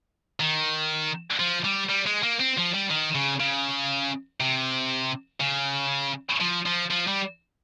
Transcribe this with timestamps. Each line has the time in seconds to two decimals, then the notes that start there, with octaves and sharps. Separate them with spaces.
0.40 D#3
1.39 F3
1.65 G3
1.90 G3
2.07 G#3
2.23 A#3
2.40 C4
2.57 F3
2.74 G3
2.90 D#3
3.15 C#3
3.40 C#3
4.40 C3
5.40 C#3
6.40 F3
6.66 F3
6.91 F3
7.07 G3